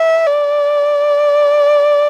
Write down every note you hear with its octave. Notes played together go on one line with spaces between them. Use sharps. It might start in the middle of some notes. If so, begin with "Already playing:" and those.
Already playing: E5
D5